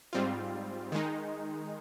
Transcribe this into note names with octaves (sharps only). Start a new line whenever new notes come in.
G#2 G3 C4 F4
D#3 G#3 D#4